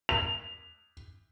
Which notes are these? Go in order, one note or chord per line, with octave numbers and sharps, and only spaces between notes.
F7